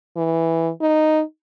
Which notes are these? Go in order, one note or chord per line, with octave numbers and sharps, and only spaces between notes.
E3
D#4